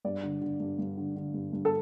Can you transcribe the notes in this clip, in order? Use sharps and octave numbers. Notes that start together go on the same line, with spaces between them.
G2 D5
D3
D3
G2
G2
D3
D3
G2
G2
A4